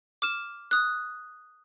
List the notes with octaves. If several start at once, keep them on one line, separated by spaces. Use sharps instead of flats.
D6 F6 E7
D#6 F#6